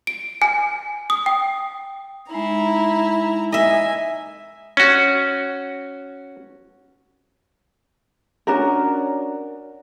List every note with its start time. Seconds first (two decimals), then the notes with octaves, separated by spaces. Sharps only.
0.07 D7
0.42 G#5
1.10 D#6
1.26 G5
2.31 G#3 D#4 E4 A#5
3.52 D#5 E5 G#5
4.77 C#4 F#4
8.47 C#4 D4 F#4 A#4